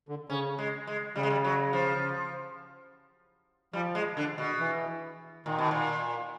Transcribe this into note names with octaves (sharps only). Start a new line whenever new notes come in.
D3
C#3 C#4
G#3
G#3
C#3 G3
G#3
G3
F#3
F3
F3 G3
G#3
D3
B2
E3
A#2 D#3
B2
A#2